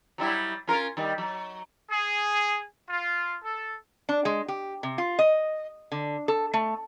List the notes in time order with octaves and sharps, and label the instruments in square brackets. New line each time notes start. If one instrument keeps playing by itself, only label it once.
[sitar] F#3 G3 E4
C#4 F4 A#4
D#3 G3
F#3
[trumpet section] G#4
F4
A4
[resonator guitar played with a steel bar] D4
G#3
G4
C3
F4
D#5
D3
A4
A3